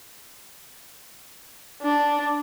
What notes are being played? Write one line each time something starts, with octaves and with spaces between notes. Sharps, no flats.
D4